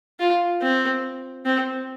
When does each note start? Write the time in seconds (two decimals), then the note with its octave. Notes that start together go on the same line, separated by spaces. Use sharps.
0.19 F4
0.61 C4
1.46 C4